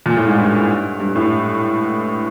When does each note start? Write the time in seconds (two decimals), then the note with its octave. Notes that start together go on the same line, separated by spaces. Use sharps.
0.06 A#2
0.17 A2
0.26 G#2
0.37 G2
1.00 G2
1.15 A2